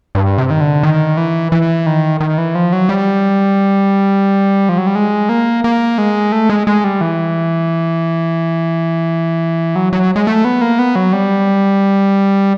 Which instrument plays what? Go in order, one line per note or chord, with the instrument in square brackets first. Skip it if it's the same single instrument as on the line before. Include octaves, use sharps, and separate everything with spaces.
[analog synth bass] G2
C3
D#3
D3
D#3
E3
E3
D#3
D#3
E3
F3
F#3
G3
F3
F#3
G3
G#3
A#3
A#3
G#3
A3
G#3
G#3
G3
E3
F#3
F#3
G#3
A3
B3
A#3
B3
F#3
G3